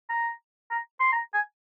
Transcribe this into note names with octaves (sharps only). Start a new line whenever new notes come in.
A#5
A#5
C6
A#5
G#5